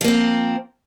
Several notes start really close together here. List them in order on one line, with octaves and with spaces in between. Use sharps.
F3 A#3 C4